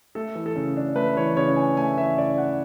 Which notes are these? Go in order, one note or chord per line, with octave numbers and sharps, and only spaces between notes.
A3 A4
E3
A4
C#3
D4
A3 B4
E3 C#5
C#3 C#5
D4 G#5
A3 G#5
E3 E5
C#3 D5
D4 F#5